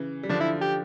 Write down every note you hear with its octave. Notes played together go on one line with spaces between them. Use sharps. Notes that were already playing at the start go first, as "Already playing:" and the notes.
Already playing: C#3 E3
G3
D3 F3 D4
E4
G4